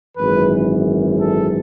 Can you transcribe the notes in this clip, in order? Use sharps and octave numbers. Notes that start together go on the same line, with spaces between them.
G#1 F#2 E3 B4
A4